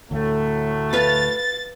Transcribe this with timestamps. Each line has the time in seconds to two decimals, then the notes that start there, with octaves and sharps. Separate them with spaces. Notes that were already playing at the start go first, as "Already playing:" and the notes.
0.11 D2 A2 F#3 A3
0.93 B4 F5 A6